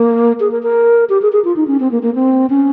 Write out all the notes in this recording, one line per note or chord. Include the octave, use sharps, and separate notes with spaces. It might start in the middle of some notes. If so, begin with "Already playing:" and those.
Already playing: A#3
G#4
A#4
A#4
G4
G#4
G#4
F4
D#4
C#4
C4
A#3
A#3
C4
C#4